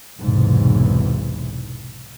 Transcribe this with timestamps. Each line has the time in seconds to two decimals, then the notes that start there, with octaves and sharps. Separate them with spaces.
0.21 B1 E2 G#2 C3 E3